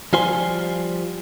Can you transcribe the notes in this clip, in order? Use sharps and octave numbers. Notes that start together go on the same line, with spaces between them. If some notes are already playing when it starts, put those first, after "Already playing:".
F3 G3 F4 C5 G#5 C6